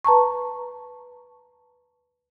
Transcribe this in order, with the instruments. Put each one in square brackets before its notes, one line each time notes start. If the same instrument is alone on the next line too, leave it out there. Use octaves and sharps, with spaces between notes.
[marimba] B4 A5 A#5 C#6